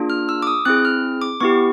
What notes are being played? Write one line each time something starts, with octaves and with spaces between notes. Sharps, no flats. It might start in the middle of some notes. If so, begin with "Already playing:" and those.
Already playing: A#3 D4 F4 G#4
F6
E6
D6
D#6
C4 E4 G#4 F#6
F6
D6
B3 E4 G4 C#6